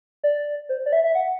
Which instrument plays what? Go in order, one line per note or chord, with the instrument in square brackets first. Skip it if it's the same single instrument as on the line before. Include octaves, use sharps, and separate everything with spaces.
[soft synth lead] D5
C5
D5
E5
E5
F#5